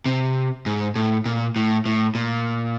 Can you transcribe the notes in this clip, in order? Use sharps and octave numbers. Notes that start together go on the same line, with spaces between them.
C3
G#2
A2
A#2
A2
A2
A#2